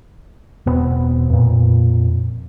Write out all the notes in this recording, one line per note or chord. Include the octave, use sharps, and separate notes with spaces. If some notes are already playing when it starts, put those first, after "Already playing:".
E1 B2 B3 C4
F2 A#2